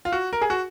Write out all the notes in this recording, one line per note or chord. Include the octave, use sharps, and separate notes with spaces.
F4
F#4
A#4
G#4
F#4